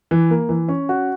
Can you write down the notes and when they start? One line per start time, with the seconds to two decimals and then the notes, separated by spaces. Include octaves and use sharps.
0.11 E3
0.31 A#3
0.49 E3
0.68 C#4
0.89 F#4